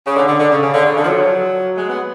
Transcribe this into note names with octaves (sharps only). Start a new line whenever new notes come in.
C#3
D3
D3
D3
C#3
C#3
D3
C#3
D3
F3
F#3
G#3
B3